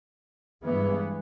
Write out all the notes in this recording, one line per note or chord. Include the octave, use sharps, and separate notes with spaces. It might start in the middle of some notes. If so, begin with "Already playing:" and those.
G2 E3 G#3 B3